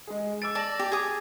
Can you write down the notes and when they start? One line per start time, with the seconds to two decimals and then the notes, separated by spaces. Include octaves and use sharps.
0.07 G#3 G#4
0.42 D6 E6 A6 D7
0.55 D5 A5 A6 A#6 F#7
0.79 G4
0.92 G#4 D#6 G#6